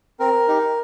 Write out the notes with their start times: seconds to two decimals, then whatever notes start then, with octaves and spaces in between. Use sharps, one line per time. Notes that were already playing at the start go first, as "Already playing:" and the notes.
0.20 C4 A#4
0.48 D#4 G4